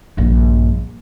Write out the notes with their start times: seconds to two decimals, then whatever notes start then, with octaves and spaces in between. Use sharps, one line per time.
0.17 A#1 G2